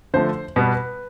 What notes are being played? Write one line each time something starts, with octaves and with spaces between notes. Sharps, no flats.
D3 F3 A3 C5
B2 G3 B3 B4